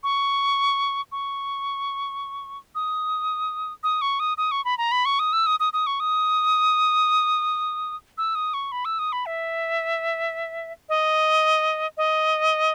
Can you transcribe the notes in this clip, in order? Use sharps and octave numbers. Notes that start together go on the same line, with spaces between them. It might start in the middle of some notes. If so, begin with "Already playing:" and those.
C#6
C#6
D#6
D#6
C#6
D#6
D#6
C#6
B5
A#5
B5
C#6
D#6
E6
D#6
D#6
D#6
C#6
D#6
E6
D#6
C#6
B5
E6
D#6
B5
E5
D#5
D#5